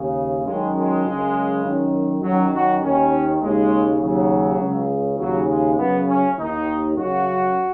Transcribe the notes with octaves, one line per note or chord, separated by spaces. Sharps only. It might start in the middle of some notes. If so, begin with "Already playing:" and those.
Already playing: D#2 C#3
F#2 D#3 G#3
G#3
F#2 C#3
F#2 D#3
F#2 D#3 F#3
F#4
D#2 D#3 C#4
D#2 C#3 G#3
D#2 C#3 F#3
C#2 C#3
D#2 C#3 F#3
G#3
F#2 C#3 B3
C#4
D#2 D#3 D#4
F#2 C#3 F#4